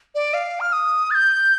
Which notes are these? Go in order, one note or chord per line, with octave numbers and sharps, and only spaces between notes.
D5
F5
F6
D#6
A6
G6